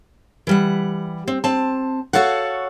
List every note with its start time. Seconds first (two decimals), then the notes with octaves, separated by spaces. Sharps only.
0.47 E3 G3 F#5
1.28 C4
1.44 C4 A5
2.13 F#4 G4 A4 C#5 F5 F#5